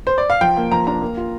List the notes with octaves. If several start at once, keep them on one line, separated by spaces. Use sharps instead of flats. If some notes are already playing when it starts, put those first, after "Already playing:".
C5
D5
F5
F3 G5
A#3
F3 A#5
D4 A#5
A#3
F4